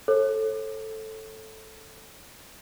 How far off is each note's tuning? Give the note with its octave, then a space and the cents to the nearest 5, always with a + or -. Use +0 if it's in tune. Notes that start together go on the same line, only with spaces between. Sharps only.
A4 +0 C#5 -40